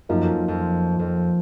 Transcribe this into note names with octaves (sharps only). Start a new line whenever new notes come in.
F#2 F3 A#3 D#4
F2
F2
F2